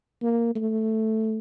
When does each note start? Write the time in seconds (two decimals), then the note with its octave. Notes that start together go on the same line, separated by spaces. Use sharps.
0.22 A#3
0.56 A3